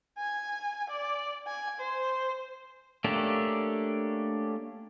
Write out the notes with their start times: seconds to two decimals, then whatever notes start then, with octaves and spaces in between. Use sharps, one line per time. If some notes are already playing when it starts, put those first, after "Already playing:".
0.18 G#5
0.90 D5
1.47 G#5
1.80 C5
3.04 A3 A#3 C#4 D4 G4